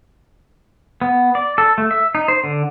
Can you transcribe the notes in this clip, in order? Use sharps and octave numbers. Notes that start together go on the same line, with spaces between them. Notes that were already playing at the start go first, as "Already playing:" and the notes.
B3
D5
A4
A3
E5
D#4
C5
D3